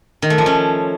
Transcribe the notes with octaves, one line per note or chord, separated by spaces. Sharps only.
D#3
A3
F3
C#4